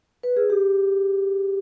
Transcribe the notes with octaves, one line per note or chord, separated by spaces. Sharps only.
B4
G#4
G4